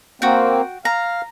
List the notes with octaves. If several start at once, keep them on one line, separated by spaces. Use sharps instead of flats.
A#3 C4 F#4 G5
F5 A#5